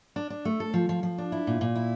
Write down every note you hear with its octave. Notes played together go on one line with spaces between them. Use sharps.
D4
D4
A3
A4
F3
F3
F3
D4
E4
A#2
A#2
E4